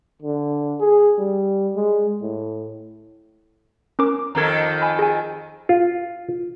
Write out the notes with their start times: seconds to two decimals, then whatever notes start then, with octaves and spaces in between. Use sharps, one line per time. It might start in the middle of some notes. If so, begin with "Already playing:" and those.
0.22 D3
0.80 G#4
1.18 G3
1.76 G#3
2.22 A2
3.99 C#4 A#4 D6
4.35 F2 D#3 A4 A#5 G#6
4.82 G#5 B5
4.99 G#4 G#5
5.69 F4